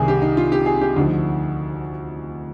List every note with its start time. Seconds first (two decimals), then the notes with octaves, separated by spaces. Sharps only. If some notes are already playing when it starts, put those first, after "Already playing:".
Already playing: C2 C3 D#3 G#4
0.08 G4
0.22 D#4
0.37 F4
0.52 G4
0.66 G#4
0.81 G4
0.96 D2 D3 F3 D#4